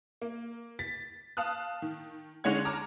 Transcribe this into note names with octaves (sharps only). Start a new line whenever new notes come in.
A#3
A6 B6
F5 A5 D#6 F#6
D#3
D3 G#3 C#4 C#5 F#5 G#6
A5 A#5 D6 F6